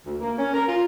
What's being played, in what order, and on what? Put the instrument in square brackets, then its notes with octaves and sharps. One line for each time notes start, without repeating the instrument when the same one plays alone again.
[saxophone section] D2
A#3
C#4
A#4
F4